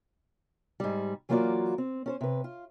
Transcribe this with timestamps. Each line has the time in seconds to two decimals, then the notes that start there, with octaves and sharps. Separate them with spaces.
0.80 G#2 G3
1.29 E3 F#3 A#3 F4 F#4 D5
1.78 C4
2.06 C#4 A4 C5
2.21 C3 B4
2.44 F4